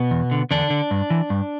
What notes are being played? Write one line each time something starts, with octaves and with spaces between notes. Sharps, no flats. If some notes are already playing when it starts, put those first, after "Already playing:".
Already playing: B2 B3
E2
D3
E2 D3 D4
D3
G2
E3
G2